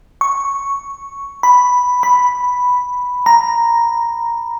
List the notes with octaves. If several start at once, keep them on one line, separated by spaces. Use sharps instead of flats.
C#6
B5
B5
A#5